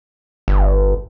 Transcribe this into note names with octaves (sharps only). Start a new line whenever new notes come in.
G1